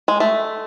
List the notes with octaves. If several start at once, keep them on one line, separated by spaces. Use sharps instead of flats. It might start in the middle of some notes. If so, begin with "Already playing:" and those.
G#3
A3